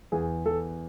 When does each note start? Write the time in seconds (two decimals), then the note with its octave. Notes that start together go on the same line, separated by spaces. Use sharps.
0.12 E2 G#4
0.46 E2 A4